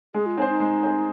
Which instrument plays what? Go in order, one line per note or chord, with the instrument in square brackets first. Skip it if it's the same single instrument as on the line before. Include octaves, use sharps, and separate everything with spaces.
[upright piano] G#3 [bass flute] G#4
[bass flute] F4
[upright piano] C4 G#4 C5 [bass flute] D#4
[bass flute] D#4
[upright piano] G#3
C4 G#4 C5